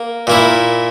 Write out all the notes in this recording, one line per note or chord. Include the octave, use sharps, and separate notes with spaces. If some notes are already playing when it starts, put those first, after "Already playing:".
Already playing: A#3
A#2 A#3 E4